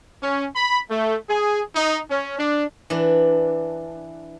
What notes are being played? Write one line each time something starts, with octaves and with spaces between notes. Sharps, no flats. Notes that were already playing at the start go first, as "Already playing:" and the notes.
C#4
B5
A3
G#4
D#4
C#4
D4
E3 D4